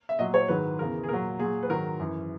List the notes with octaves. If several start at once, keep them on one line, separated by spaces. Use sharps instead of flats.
E5
A#2 F#3 D#5
C#5
G#2 D#3 F#3 B4
E2 C#3 E3 A#4
G#4
A#2 F#3 A#4
A#2 F#3 G#4
B4
G#2 D#3 F#3 A#4
F#2 E3